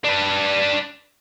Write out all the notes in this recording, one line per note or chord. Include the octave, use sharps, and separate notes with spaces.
D4 B4